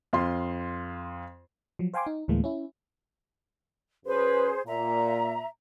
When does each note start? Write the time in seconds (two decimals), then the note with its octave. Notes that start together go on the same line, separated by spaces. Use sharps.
0.13 F2 F4 C6
1.79 F3 F#3
1.94 C5 F5 G5 G#5 C6 D6
2.07 D#4
2.28 D2 A2 E3 G#3 A#3
2.44 C#4 E4
4.06 F#2 C#4 G#4 B4 C5
4.67 A#2 E5 A#5